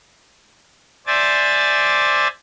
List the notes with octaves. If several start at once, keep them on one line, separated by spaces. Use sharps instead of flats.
C5 D5 E5 G#5 A6